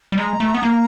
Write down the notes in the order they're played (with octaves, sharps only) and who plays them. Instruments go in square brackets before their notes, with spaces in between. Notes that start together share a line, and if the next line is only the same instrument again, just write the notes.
[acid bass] G3
[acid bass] G#3 [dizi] A#5
[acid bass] A3
B3
A#3